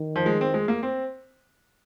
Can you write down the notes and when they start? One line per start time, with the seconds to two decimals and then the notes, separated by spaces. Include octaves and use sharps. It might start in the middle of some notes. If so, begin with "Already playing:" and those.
Already playing: D#3
0.16 F3
0.26 G#3
0.41 C4
0.54 G#3
0.68 A#3
0.83 C4